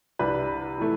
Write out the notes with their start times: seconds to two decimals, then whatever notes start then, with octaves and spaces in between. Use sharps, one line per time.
0.19 C2 C3 G3 D4 B4
0.78 A2 E3 A3